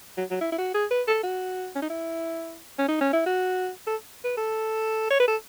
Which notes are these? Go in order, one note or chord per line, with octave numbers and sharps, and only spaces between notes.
F#3
F#3
E4
E4
F#4
G#4
B4
A4
F#4
C#4
D#4
E4
C#4
D#4
C#4
E4
F#4
A4
B4
A4
C#5
B4
A4